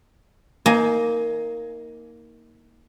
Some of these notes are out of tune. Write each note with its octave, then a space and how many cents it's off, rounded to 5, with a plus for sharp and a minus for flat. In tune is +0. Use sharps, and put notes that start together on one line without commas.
A#3 +0 D#4 +30 G#5 +15